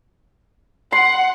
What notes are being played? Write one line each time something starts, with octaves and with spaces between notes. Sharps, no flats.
F#5 C6